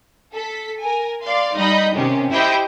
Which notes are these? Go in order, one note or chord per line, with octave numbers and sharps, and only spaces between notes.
A4 B6
A#4 G#5
D5 F5 C6
G3 D#4 D#5 B5 G6
C3 D#3 C#4 G4
E4 G4 C5 D#5 G5